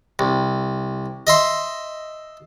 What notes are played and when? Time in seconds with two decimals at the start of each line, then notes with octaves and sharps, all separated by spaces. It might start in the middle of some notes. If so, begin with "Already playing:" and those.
0.19 C2
1.27 D#5 E5 C6